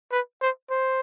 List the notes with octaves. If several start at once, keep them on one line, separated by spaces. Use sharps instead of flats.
B4
C5
C5